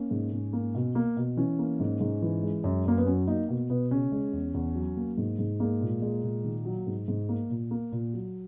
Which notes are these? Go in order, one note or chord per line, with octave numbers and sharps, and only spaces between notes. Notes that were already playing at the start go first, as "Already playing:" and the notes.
Already playing: A#3 C#4
G#2
G#2
A#3
B2
A#3
B2
E3 C#4
A#3
G#2
G#2
E3
G#3
F#2
F#2 A#3
B3
F#3 C#4
A#3 D#4
B2
B2 B3
C#3 C#4
G#3
E2
E2
F#3
A#3
G#2
G#2
G#3 A#3
A#2
G#3
A#2
D#3
F#3
G#2
G#2
A#3
A#2
A#3
A#2
F#3